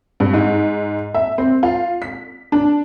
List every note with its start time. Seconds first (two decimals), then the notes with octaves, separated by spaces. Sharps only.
0.20 G2
0.33 G#2
1.14 E5
1.38 C4
1.63 F4
2.02 B6
2.52 D4